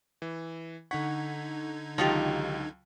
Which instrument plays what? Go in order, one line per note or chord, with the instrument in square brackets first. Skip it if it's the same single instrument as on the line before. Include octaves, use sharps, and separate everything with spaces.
[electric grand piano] E3
[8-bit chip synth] D3 D#4 G#6 [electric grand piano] F#5 C#6 B6
[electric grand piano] C#2 F#3 A5 [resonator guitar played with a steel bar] D#3 F4 G4